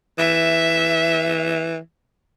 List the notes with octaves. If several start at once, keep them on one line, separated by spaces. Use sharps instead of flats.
E3 E5